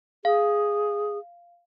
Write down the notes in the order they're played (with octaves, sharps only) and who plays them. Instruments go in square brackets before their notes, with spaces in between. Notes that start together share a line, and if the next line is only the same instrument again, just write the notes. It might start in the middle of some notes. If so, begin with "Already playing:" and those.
[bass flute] G#4 [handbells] F5